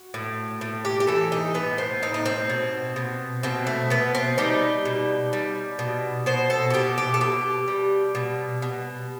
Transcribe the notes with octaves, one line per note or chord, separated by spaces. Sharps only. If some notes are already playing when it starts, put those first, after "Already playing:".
Already playing: F#4
A2
A2
G4
G4
E3 A4
D#4
A2 B3
C4
A2 D#4
D#4
C4
B2
B2
B2 C4
A3
B2 B3
C4
G3 D#4
B2
G3
B2
B2 C5
A4
F#4
B2 G4
G4
A4
B2 G4
G3
B2
B2